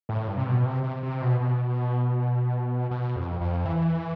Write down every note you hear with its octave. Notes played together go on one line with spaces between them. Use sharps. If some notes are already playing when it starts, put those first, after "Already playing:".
A2
G2
C3
B2
C3
C3
C3
B2
B2
B2
F2
F2
E3